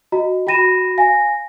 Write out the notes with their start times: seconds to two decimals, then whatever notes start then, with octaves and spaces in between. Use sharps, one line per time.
0.12 F#4 D#5 A#5
0.47 F#4 G5 B5 A#6 D#7 E7
0.98 F5 G#5 A#6